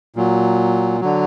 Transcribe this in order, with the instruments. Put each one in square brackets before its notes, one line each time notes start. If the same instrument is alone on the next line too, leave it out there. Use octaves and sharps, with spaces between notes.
[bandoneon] A#2 F#3
D3 F#3